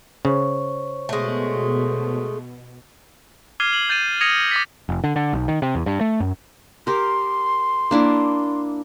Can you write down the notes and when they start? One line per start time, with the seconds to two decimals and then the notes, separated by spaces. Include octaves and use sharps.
0.25 C#3 C5 C#5 C#6
1.09 B2 G#3 A3
3.60 D6 F6 G#6 C7 D#7 G7
3.73 F#7
3.89 G6 A6 C7 D#7
4.21 D#6 G#6 A#6 C#7 D#7 F7
4.51 D6 A6 B6
4.89 F1
5.04 D3
5.16 D3
5.33 B1
5.48 D#3
5.62 C3
5.75 E2
5.86 G2
6.01 A3
6.20 F#2
6.87 G4 A#4 C6
7.91 A#3 D4 E4